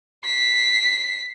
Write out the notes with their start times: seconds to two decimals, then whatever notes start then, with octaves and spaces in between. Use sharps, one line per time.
0.25 B6 C7